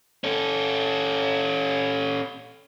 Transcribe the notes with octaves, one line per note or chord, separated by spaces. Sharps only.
C#4 A4